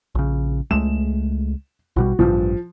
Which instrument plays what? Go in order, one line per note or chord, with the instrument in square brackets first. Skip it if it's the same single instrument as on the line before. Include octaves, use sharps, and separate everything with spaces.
[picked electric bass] A#1 C#3
[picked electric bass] C#2 G#3 A3 [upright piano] E7
[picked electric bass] A#1 B2 G3 [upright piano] F#4
[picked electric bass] A1 G2 [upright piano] F3